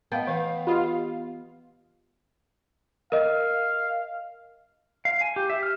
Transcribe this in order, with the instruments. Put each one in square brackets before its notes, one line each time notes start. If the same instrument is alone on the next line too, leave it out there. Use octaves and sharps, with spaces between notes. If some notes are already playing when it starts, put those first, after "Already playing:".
[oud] B3 [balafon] D#5 F5 A5 [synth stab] G5
[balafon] E3 B4 [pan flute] F5
[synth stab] F4 [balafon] G4 D#5 B5
[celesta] A#4 D#5 [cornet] F5
[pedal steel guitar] F5
G#5
G4
E5
F6